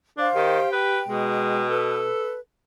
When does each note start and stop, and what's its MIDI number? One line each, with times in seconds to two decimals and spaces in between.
0.17 0.28 62
0.17 0.68 72
0.17 0.68 77
0.35 0.59 51
0.35 1.02 67
0.72 1.00 71
0.72 1.67 79
1.08 2.10 47
1.08 1.64 56
1.70 2.37 69
1.70 2.38 71